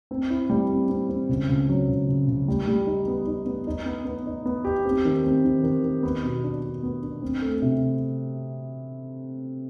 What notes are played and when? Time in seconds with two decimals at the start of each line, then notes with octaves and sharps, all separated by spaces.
0.11 C4
0.30 E4
0.50 G3
0.69 C4
0.90 C4
1.09 C4
1.29 C#2
1.49 C#2
1.69 F#3
1.89 C#2
2.08 C#2
2.27 C#2
2.48 G3
2.67 G3
2.87 D#4
3.07 B3
3.27 D#4
3.46 B3
3.67 D#4
3.86 B3
4.05 B3
4.26 D#4
4.46 B3
4.65 G4
4.85 C4
5.05 D#3
5.24 C4
5.44 D#3
5.63 D#3
5.84 D#3
6.03 B3
6.23 B2
6.44 D4
6.63 D4
6.83 B3
7.02 D4
7.22 C4
7.42 A3
7.62 C3